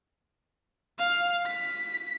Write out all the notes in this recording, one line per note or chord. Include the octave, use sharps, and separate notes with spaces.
F5
B6